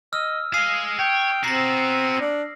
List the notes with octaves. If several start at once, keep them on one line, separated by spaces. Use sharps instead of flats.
D#5 E6 F6
G#4 D#5 F5 D#6 C7
C#5 G5
B3 C4 F#4 A#5 A#6 C7
D4